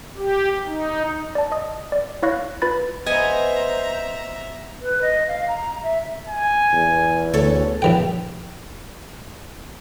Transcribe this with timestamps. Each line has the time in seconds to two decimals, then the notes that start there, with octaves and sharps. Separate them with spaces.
0.17 G4
0.67 D#4
1.35 D5 A5
1.52 D#5 D#6
1.92 D5
2.23 E4 C#5 F5 C#6 F#6 A#6
2.62 F4 B4 B5 A6
3.06 B3 C5 D#5 E5 G#5 A#5
4.82 B4
5.02 D#5
5.28 F5
5.48 A#5
5.61 A#5
5.83 E5
6.28 G#5
6.73 E2
7.33 D2 A4 C#5
7.82 A#1 E3 G5